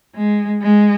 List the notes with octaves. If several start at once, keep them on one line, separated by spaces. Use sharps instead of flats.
G#3
G#3